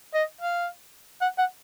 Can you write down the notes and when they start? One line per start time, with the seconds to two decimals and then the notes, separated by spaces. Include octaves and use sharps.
0.15 D#5
0.41 F5
1.22 F#5
1.39 F#5